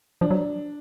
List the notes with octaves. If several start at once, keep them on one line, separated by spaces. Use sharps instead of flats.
F3 D4
F#3